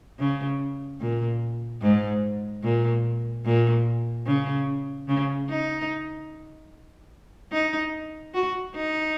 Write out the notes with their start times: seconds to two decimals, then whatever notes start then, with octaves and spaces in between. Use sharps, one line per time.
0.19 C#3
1.01 A#2
1.82 G#2
2.64 A#2
3.45 A#2
4.27 C#3
5.08 C#3
5.49 D#4
7.52 D#4
8.34 F#4
8.75 D#4